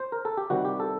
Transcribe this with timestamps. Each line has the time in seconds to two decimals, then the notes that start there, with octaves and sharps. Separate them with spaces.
0.00 C5
0.12 A#4
0.25 A4
0.37 G4
0.50 C3 D#3 G3 F#4
0.65 G4
0.80 A4